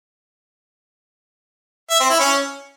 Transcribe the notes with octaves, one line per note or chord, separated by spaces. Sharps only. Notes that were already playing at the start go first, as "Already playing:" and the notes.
E5
C4
E4
C#4